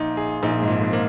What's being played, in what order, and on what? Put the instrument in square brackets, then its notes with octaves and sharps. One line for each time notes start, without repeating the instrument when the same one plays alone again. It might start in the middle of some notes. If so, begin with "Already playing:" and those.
Already playing: [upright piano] A#1 A#2 [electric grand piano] D#4
[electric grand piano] G#4
[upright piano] A#1 A#2 [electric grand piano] D#4
[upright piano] G#1 G#2
[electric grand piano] F3
[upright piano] G#1 G#2
[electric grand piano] A#3